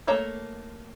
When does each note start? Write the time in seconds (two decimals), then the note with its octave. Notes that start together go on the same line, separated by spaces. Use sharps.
0.07 A3 A#3 C#5 A5 A#5